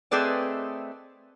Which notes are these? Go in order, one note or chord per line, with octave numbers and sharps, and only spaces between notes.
A3 C4 G#4 B4 D5 D#5